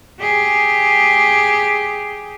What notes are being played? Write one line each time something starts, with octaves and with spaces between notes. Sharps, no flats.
G4 G#4